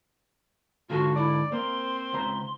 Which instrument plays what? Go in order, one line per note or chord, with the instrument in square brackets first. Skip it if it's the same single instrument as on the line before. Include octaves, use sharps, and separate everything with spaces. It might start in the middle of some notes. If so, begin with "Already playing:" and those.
[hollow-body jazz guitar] G#2 D3 A4 [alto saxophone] F4 [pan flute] F#4
[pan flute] E4 [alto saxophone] D5
[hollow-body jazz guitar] A#3 [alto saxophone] C4 [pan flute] C6
[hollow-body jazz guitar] C#2 C5 A#5